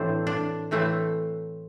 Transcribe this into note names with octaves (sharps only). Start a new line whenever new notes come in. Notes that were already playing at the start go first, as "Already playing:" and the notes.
Already playing: A2 E3 A3 C4 D4
D4
A2 E3 A3 C4